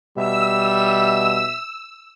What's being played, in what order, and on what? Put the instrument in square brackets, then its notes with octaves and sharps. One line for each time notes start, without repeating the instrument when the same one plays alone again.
[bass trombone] B2 [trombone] G3 [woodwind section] E5 [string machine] E6